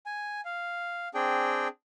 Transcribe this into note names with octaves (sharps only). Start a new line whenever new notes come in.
G#5
F5
C4 D4 G#4 G5